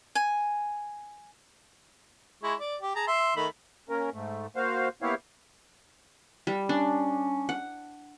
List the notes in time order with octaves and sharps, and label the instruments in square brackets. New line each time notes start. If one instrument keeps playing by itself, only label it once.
[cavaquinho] G#5
[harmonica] G#3 E4 C#6
D5
G4
G#4 A5 A#5
E5 C6
D#3 A3 B5
[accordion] A#3 C#4 A#4
G#2 A3
A#3 F#4 C5 F5
A#3 B3 E4 G4 C#5 F5
[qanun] G3
[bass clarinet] C#4 [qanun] D4
[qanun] F#5